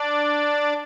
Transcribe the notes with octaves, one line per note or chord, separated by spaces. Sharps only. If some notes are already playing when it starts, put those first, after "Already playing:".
Already playing: D4 D5